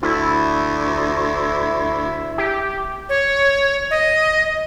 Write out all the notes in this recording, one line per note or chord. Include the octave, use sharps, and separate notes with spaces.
D2 E4
G4
C#5
D#5